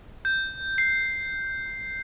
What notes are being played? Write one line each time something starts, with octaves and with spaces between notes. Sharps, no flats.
G6
C7